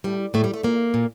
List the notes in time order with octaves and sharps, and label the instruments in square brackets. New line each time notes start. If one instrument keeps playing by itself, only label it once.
[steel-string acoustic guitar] A2 G3
A2 A3
G3
A3
A#2 A#3
A#2